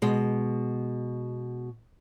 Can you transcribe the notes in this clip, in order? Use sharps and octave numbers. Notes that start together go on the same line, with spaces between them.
B2 G#3